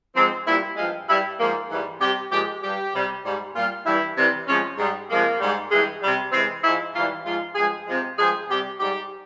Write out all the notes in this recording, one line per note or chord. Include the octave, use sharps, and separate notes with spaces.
G#2 F3 G#3 C4
A#2 G3 E4
G2 F3 G#3 F4
G2 G3 E4
G#2 F3 G#3 A#3
G#2 E3 G3
C3 G3 G4
A#2 F3 G#3 G4
G2 G3 G4
C3 G3
G#2 G3
A#2 G3 F4
G2 E3 G3 E4
C3 E3 G3
C3 F3 G#3 C#4
G#2 G3 G#3
C3 F3 G#3 A#3
G#2 G3
G2 E3 G#3
C3 G3
C3 E3 G#3 C4
G#2 F3 G#3 E4
G#2 E3 G3 F4
G#2 F3 G#3 F4
G2 F3 G#3 G#4
C3 F3 G#3
G2 F3 G#3 G#4
C3 G3 G4
G#2 G3 G4